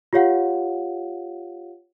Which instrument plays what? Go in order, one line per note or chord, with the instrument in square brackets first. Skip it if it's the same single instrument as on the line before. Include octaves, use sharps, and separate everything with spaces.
[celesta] F4 G4 C#5 F5 F#5